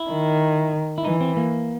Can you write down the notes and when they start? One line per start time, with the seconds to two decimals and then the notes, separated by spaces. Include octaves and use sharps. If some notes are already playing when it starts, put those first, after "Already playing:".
Already playing: E4
0.10 D#3
0.98 E4
1.05 E3 D#4
1.21 C4
1.37 A#3